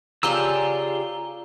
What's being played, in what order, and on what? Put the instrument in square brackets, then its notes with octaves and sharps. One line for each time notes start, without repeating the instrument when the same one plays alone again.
[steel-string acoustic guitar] C#3 G#4 D5 [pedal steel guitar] F4 G4 E6 [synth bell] A#5 G7